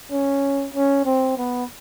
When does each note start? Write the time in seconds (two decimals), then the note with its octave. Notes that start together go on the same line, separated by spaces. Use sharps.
0.12 C#4
0.74 C#4
1.05 C4
1.37 B3